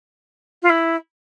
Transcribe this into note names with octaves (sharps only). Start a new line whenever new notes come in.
F4
E4